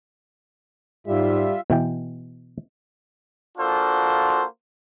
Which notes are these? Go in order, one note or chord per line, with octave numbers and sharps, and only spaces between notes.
G#2 G3 F4 E5
B2 E3 G5
A#3 D4 F4 F#4 A4 C5